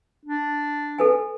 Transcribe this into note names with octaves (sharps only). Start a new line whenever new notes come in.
D4
A4 B4 G#5